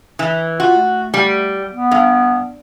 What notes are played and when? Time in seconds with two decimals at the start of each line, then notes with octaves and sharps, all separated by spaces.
0.19 E3
0.60 F4 F#4
0.77 A3
1.14 G3
1.73 B3
1.91 G2